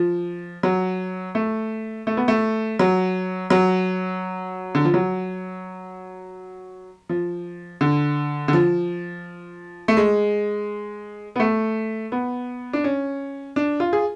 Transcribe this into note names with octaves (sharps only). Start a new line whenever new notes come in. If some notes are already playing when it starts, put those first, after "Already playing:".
Already playing: F3
F#3
A3
A3
B3
A3
F#3
F#3
D3
F3
F#3
F3
D3
D3
F3
A3
G#3
B3
A3
B3
D4
C#4
D4
F4
G#4